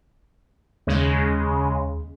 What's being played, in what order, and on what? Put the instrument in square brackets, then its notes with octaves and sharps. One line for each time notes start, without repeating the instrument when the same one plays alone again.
[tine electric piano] D#2 [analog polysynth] C#3 G#3